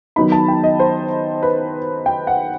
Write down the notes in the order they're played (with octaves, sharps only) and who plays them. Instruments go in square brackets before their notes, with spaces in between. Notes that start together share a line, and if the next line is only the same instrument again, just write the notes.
[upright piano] D#3 F#3 B3 D#4 B5
A5
G5
D#5
C5
B4
G5
F#5